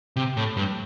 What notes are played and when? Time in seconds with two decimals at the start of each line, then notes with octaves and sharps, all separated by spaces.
0.16 C3
0.37 A2
0.57 G2